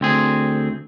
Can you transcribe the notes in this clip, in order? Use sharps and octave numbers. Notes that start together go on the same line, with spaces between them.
D2 C4 G#4